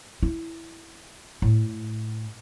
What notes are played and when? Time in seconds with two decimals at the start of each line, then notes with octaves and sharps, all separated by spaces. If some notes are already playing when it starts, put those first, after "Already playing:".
0.23 E4
1.42 A2